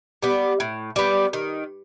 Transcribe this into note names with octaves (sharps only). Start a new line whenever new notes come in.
G3 B3
A2
G3 B3
D#3